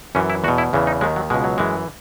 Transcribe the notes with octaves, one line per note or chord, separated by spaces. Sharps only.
F#2 E3 C#4
E4
E2 B2 F#4
E4
E2 C#3 E3
D#4
D#2 D#3 G#3
F#3
C#2 B2 G#3
F#3
F#2 E3 G#3